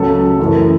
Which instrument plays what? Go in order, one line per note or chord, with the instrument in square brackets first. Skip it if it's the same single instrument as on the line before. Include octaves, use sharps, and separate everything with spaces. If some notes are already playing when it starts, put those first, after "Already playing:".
Already playing: [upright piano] C#2 C#3 F#3 A3 A4
F#2 E3 A3